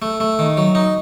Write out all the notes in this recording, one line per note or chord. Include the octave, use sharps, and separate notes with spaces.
A3
A3
D#3
F#3
D#4